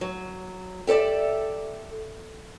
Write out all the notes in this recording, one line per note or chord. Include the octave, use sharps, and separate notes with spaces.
F#3
G4 A4 C5 D5 E5